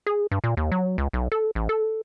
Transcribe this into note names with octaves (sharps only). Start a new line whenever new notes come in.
G#4
G2
A#2
D#2
F#3
C#2
B1
A4
A1
A4